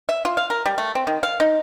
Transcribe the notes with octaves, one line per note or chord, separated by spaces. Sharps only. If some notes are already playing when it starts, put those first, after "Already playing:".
E5
F4
F5
A#4
G3
A3
C4
D#3
F5
D#4